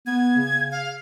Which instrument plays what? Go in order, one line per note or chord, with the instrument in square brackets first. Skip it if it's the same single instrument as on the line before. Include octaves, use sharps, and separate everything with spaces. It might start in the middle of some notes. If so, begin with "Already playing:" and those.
[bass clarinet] B3 [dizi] G#6
[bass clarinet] C#3
[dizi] F5